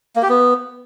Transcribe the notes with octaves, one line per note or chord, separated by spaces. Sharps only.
A#3
G4
B3